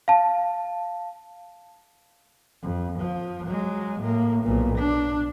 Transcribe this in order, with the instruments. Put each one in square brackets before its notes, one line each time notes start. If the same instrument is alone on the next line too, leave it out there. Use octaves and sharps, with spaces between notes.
[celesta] F5 A5
[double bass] F2
F3
F#3 G#3
A2 A#3
B1 A#2
D4